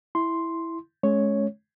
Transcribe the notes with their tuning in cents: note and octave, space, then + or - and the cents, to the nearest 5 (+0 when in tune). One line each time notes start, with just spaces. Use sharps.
E4 +0 C6 +0
G#3 +30 C#4 +0 C#5 +0